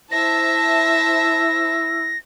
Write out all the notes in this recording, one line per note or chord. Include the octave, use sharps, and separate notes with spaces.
E4 C5 E5 A5 A#6